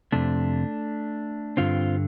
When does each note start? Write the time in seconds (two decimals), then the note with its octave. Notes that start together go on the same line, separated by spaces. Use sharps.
0.12 F2 C3 A3 D4
1.57 G2 D3 C4 F4